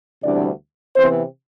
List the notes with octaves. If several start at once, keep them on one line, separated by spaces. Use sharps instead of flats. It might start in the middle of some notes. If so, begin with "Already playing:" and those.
D2 C3 E3 G3 B3 D4 D5
C3 E3 B3 C4 C5